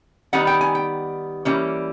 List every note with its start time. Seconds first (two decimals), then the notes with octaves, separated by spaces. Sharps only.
0.33 D#3 G3 B3 D#4 F#5
0.47 G5
0.61 G#5
0.75 G5
1.45 E3 G3 A#3 C#4